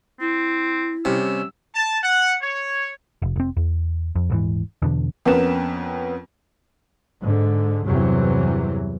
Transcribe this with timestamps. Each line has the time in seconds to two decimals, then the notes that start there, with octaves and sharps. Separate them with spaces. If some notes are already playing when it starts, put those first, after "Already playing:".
0.21 C4 E4
1.05 C3 G3 C#4 E6
1.74 A5
2.03 F#5
2.41 C#5
3.22 F1
3.36 F1 C4
3.57 E2
4.16 F2
4.30 D#1 G#2 E3
4.82 E2 B2 D3
5.25 F2 B3 C#4 A#4 B4 E7
7.22 G#2 D3
7.86 E2 G2 C3 E3 F#3